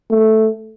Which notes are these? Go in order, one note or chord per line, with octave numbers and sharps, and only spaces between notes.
A3